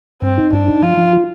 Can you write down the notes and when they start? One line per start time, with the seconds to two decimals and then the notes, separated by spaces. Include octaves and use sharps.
0.22 G2 C4
0.38 D#4
0.53 G2 D4
0.68 D#4
0.83 F3 F4
0.98 F3
1.13 F4